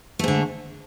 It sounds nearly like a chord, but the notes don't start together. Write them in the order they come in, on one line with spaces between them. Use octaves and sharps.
A3 G#2 D3